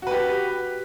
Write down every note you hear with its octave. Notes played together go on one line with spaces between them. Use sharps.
F#4 G4 B4